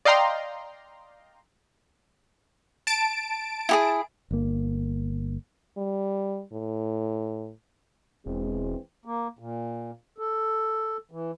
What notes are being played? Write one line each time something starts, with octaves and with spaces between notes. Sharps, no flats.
D5 D#5 F5 G5 A#5 C6
A5 D7
E4 G4 G#4
G1 A#3
G3
A2
E1 E3 G#3 C4
A#3
A#2
A4
E3